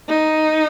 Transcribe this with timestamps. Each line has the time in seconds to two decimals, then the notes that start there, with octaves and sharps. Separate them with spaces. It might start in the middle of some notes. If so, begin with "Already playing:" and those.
0.08 D#4